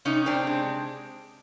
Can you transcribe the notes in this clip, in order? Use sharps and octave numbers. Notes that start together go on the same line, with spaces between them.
C3 C#4 D#4
C3 C4 D4
G#3